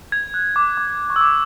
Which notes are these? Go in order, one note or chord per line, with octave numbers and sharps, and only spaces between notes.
G#6
F#6
D6
D6
C#6
E6
D6